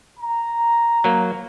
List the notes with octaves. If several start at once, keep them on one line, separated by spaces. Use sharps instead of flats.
A#5
F#3 A#3